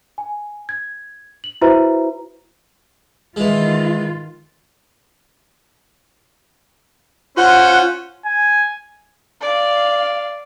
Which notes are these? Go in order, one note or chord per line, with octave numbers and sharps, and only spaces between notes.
G#5
G#6
F#7
E4 F#4 B4 C5 E5 A#5
D#3 E3 G#3 F4
C#4 F4 C5 F#5
G#5
D5 F5